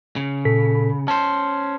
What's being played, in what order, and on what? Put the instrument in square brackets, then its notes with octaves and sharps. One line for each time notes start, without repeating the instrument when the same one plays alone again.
[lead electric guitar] C#3
[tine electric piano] A#2 A4 B6
[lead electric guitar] C#4 C5 [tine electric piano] A5